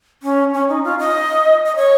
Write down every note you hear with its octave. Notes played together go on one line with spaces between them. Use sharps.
C#4
C#4
D#4
F4
D#5
D#5
C#5